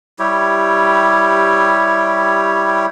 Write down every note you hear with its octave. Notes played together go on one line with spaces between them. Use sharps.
G3 E4 G4 C#5